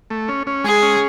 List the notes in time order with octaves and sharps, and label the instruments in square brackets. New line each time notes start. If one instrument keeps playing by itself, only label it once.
[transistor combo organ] A3
C#4
C#4
[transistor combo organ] G#3 [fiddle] G#4
[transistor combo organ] C#4